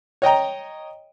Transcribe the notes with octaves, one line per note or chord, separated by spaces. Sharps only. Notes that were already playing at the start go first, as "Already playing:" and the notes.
C#5 D#5 G5 A#5